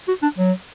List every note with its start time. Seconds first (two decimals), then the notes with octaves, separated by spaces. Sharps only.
0.08 F#4
0.22 D4
0.38 F#3